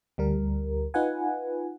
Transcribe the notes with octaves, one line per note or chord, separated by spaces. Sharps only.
D2 G3 A#4
D#4 F4 B4 F#5 G#5